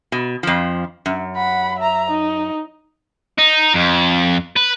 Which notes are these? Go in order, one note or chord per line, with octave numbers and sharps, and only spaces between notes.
B2
F2 F3
F#2
F#5 B5
E5 A#5
D#4
D#4
F2
B4